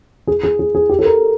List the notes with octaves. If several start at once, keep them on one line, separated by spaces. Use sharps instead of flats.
G#4
G#4
G#4
G#4
G4
A4
A#4